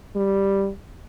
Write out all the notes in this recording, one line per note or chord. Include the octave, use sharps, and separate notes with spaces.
G3